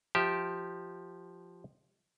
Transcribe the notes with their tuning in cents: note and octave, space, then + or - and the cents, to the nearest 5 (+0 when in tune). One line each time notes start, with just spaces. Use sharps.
F3 +0 G4 -10 E5 +0